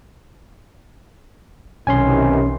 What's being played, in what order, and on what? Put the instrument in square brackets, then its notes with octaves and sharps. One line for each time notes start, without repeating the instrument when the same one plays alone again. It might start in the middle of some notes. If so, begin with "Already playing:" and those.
[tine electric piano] B1 C#4 C6 [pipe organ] C3 D#3 E3 [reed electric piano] G#5